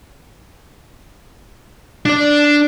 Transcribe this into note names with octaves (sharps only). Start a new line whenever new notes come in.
D4 D5